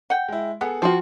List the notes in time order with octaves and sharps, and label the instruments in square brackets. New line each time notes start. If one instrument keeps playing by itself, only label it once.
[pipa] F#5 G5
[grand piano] G#3 E4
[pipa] B3 [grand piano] G#4 A4 F#5
[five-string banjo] F3 F#4 [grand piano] F4 G5 C6